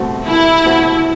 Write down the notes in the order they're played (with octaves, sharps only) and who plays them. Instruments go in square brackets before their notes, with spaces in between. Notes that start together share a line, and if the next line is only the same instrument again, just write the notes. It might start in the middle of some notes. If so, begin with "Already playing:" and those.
Already playing: [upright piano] C2 B2 A3 C4 F#4
[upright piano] C2 [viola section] E4
[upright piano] B2 A3 C4 F#4